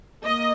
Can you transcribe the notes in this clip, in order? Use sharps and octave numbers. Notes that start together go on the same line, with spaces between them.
A#3 D#5